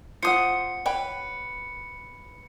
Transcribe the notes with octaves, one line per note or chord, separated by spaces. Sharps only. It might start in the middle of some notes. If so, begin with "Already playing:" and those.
F4 C5 F#5 D#6 C#7
A4 B4 C#5 G5